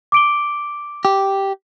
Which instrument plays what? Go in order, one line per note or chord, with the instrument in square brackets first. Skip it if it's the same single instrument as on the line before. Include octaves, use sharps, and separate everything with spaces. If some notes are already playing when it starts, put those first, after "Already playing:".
[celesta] D6 D7 G7
[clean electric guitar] G4